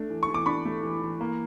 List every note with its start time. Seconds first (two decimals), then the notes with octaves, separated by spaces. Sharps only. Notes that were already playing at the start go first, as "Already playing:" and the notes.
Already playing: A3 D4
0.10 E3
0.23 C#6
0.28 E3
0.34 D6
0.46 D4 B5 C#6
0.65 A3
0.83 E3
1.02 E3
1.21 A#3